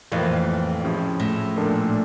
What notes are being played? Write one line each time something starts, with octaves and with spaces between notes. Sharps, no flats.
F2 A2 E3 A#3
C#3 F3 C#4 E4
A2
A#2 F3 A#3 D4 A4